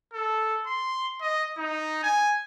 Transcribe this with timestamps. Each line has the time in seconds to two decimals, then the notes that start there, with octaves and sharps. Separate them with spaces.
0.13 A4
0.66 C6
1.21 D#5
1.58 D#4
2.03 G#5